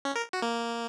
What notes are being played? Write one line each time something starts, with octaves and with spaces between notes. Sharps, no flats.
C#4
A#4
F#4
A#3